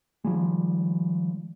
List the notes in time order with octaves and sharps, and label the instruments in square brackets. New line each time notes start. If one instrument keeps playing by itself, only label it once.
[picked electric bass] D#3 F3 G3 G#3